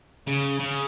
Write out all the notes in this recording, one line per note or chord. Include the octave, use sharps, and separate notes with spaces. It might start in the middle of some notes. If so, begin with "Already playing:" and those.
C#3
C#3